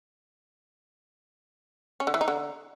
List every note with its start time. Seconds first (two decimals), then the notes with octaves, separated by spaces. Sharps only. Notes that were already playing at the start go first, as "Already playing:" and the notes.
2.00 C#4
2.07 D3
2.14 E3
2.21 D#4
2.28 D3